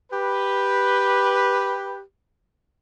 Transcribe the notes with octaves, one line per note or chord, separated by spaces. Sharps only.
G4 B4